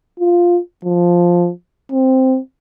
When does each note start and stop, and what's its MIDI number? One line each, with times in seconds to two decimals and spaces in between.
0.20 0.59 65
0.85 1.50 53
1.92 2.39 60